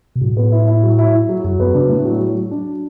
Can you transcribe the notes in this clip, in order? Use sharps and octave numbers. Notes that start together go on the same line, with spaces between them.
B2
A2 F#3
B3
E4
E4
F#3
E4
E4
F#3
F#2 F#3
F#2 B3
C#3 D4
A2
F#3
F#3
F#3
D4